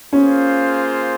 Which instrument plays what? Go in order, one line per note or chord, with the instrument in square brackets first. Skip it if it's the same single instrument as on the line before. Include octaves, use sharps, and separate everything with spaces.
[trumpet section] A#3 F4 G#4 C5 [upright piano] C#4